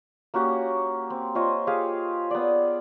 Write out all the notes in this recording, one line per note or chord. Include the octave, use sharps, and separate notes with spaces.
A#3 C#4 F#4 G4
C4
F4 C5 C#5 D#5
G4 G#4 F5
B3 D5